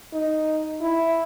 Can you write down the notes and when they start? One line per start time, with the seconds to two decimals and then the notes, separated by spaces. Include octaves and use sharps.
0.14 D#4
0.82 E4